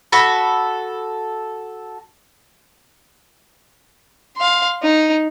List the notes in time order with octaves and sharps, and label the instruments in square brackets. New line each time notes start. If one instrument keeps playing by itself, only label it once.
[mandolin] F#4 A4 B5
[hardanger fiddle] F5 C6
D#4